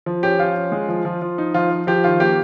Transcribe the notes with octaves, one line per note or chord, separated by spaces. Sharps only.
F3
C#4 G4
F3 F4
C#4
G#3
F3
F3
F3
D#4
F3 F4
F3
F3 G4
D#3 F4
A#3 G4